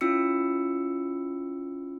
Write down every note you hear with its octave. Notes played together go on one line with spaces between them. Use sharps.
C#4 E4 F4 E6 C#7